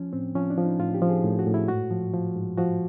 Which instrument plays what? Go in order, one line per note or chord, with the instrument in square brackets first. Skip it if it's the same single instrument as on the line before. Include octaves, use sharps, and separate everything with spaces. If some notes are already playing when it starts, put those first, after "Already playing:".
Already playing: [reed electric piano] F3 C#4
A2 C4
F3 C#4
D4
F3
D#4
A2 F4
G4
F3
G#4
A2
F#4
A2
E4
G#2 F#4
F3
F3
G#2
F3 F#4